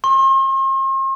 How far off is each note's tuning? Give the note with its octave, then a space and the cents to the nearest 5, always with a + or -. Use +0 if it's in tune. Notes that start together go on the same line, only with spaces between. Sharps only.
C6 +45